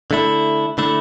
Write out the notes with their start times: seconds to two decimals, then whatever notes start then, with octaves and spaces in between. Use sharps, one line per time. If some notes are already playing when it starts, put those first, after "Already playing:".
0.11 D3 A3 E4
0.78 D3 A3 E4